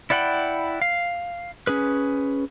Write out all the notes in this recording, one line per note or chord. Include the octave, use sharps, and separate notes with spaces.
E4 D5 F#5 G5 B5
F5
C#4 G#4 B4